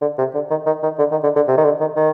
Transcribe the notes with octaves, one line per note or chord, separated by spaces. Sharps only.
D3
C3
D3
D#3
D#3
D#3
D3
D#3
D3
D3
C3
D#3
D3
D#3
D#3